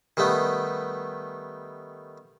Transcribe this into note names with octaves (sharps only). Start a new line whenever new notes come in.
D#3 G3 A3 B3